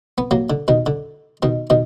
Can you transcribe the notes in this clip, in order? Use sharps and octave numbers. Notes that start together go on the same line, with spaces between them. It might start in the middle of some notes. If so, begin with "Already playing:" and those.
B3
F#3 A#3
D3
B2 D#3
D3
B2 D#3
B2 D#3